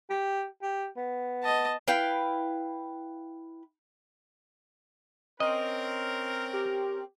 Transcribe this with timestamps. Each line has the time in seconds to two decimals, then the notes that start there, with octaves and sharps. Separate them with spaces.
0.10 G4
0.62 G4
0.97 B3
1.43 D#5 A5
1.88 E4 B4 F5 G5
5.40 C4 C#4 A#4 D#5
6.53 G4